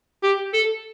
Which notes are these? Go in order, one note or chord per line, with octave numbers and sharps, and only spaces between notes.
G4
A4